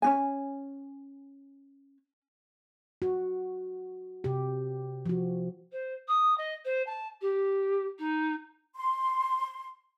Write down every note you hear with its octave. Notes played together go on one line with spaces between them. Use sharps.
C#4 D4 G#5
F#4
C3 G4
F3 F#4
C5
D#6
D#5
C5
A5
G4
D#4
C6